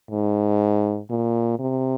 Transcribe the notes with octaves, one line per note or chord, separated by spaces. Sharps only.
G#2
A#2
C3